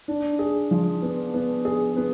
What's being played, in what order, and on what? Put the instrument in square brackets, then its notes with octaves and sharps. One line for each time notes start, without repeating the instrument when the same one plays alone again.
[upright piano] D4
G#4
F3
B3
B3
G#4
B3